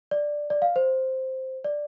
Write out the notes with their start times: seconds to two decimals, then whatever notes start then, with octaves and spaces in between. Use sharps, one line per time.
0.11 D5
0.50 D5
0.62 F5
0.76 C5
1.64 D5